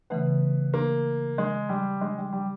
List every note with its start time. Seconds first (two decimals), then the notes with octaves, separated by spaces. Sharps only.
0.10 C#3 E3 A3 B3
0.74 A#3
1.38 G#3
1.69 G3
2.01 G#3
2.18 G3
2.33 G3